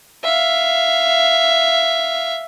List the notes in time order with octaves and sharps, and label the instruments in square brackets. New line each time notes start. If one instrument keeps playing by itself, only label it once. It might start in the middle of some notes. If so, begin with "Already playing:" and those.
[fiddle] E5 F5